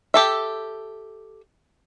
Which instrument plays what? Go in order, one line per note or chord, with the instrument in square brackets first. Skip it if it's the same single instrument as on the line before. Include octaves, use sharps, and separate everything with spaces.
[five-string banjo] G4 A4 E5